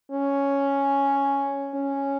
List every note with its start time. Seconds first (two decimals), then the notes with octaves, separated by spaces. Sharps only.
0.12 C#4
1.74 C#4